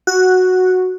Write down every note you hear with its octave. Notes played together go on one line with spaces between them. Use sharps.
F#4